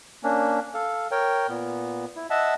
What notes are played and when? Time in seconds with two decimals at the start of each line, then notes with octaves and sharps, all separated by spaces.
0.23 A#3 C#4 D4
0.74 A4 F5
1.11 A#4 C#5 G5
1.49 A#2 B3
2.16 E4
2.30 D#5 E5 F#5 A5 E6